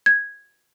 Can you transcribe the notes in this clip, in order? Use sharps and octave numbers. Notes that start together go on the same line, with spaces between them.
G#6